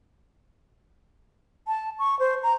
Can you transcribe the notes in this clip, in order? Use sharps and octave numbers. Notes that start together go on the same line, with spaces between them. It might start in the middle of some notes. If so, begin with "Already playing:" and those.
A5
C#6
C5
A#5